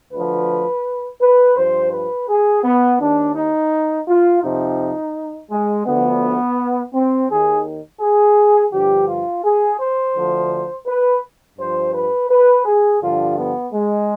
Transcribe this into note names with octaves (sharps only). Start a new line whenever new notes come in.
D2 D3 F3 B4
B4
G2 F3 C5
B4
G#4
B3
D#2 D#3 D4
D#4
F4
F2 C3 F3 D#4
G#3
D2 D3 F3 B3
C4
D#2 D#3 G#4
G#4
G2 D3 F3 G4
F4
G#4
C5
D2 D3 F3
B4
G2 F3 C5
B4
B4
G#4
G2 D3 F3 F4
B3
G#3